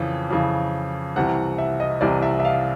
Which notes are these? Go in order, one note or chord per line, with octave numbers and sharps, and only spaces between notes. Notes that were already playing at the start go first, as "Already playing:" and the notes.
Already playing: F2 C#3 E3
F2 C#3 E3
C2 C3 E3 F#5
E5
D#5
C2 C3 E3 D5
E5
E5
F5